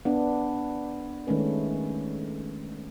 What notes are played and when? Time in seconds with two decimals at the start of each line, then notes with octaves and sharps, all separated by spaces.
0.05 B3 D4
1.27 D#3 G#3 A3 C#4 B4